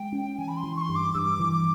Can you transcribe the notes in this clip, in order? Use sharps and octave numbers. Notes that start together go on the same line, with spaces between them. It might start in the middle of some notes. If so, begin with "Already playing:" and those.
Already playing: G#3 G5
C#4
E3 G#5
B5
C6
E3
C#6
C6
G2
D6
G2 D6 E6
E3
D6